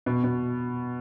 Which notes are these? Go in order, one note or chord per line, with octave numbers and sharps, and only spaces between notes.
B2
B2